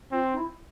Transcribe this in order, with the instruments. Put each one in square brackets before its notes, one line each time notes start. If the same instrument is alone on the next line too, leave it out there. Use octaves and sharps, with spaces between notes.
[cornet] C4 [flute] F4
[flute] D#4
E4